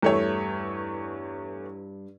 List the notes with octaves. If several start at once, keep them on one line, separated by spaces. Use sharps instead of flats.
E2 G2 A3 C#5